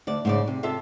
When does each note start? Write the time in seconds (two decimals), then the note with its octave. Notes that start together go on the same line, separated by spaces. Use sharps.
0.07 D2 D5
0.25 G#2 C#3 D5
0.48 C3
0.63 C3 F4 A4 E5